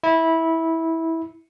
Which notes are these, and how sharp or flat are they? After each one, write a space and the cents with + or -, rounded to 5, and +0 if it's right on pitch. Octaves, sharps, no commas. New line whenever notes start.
E4 -15